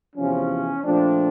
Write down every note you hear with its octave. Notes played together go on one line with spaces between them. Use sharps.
E2 C3 F3 C#4
A#2 F3 A3 C4 D4